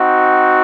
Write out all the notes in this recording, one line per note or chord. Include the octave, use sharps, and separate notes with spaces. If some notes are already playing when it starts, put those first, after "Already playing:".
Already playing: C4 D#4 F#4